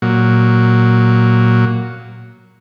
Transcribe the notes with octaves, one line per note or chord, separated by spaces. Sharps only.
A#2 F#3